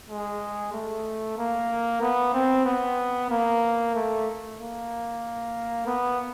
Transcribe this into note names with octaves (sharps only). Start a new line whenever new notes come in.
G#3
A3
A#3
B3
C4
B3
A#3
A3
A#3
B3